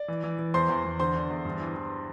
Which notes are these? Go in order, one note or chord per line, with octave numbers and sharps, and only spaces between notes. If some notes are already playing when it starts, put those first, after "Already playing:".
Already playing: D5
E3
E3
E3
E2 C5 C6
E2
E2
D3 C5 C6
D3
E2
G2
E3
E3